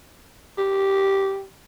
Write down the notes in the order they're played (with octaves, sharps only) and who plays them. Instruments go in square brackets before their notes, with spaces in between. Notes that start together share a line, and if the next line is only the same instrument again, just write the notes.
[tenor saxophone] G4